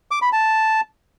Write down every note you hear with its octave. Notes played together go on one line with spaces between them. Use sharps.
D6
B5
A5